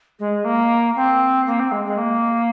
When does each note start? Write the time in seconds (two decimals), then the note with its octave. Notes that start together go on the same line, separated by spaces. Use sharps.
0.19 G#3
0.44 A#3
0.95 C4
1.46 A#3
1.59 C4
1.71 G#3
1.84 G#3
1.97 A#3